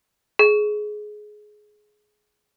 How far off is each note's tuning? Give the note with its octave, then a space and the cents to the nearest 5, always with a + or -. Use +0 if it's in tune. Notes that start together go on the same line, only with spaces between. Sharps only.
G#4 +15